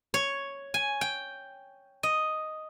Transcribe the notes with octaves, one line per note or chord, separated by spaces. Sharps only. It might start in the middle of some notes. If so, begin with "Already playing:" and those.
C#5
G#5
G5
D#5